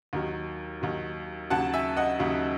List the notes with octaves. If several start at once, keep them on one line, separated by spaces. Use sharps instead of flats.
D#2 D#3 F#3
D#2 D#3 F#3
D#2 C#3 F#3 F#5 A5
E5 G#5
D#5 F#5
D#2 C#3 F#3